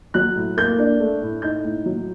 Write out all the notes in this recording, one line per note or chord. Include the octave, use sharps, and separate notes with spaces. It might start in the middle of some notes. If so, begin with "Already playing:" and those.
F#3 F#6
A2
A#3 G6
D4
A3
A2
D#4 G6
A2
F#3